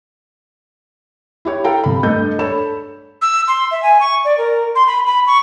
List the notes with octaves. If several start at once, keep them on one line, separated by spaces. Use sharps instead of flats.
E4 G4 C#5
A4 F5 G5 A#5
C3 B5
G2 A3 A4 D#5 G6
D4 A4 C#5 B5 E7
E6
C6
E5
G#5
C#6
D5
A#4
C6
B5
B5
C#6